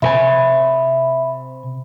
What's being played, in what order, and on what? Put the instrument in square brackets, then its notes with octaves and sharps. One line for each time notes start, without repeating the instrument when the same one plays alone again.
[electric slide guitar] C3 A#4 G#5 [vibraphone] E5 B5